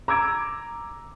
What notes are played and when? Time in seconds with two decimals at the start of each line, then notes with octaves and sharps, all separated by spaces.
0.08 A#5 D6 E6 G#6 D7